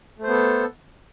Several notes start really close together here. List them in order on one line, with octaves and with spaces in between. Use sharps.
A3 C5 B3 A4